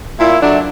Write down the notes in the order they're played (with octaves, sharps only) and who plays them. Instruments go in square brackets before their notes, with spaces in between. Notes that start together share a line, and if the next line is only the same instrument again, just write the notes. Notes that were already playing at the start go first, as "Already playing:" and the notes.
[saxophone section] A#2 E4
F#3 A3 D4